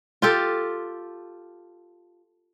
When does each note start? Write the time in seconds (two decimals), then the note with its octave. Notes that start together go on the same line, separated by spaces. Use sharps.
0.22 F4 G4 A4